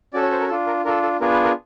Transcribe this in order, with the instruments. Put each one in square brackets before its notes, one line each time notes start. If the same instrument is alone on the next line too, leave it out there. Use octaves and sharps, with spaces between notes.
[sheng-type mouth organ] C#4 F#4 A4 D5
C#5
C5
A#4
A4
D4 F4
A#4
D4 F4 A4 A#4
A4
B3 D4 F4 G#4 A#4
B4
A#4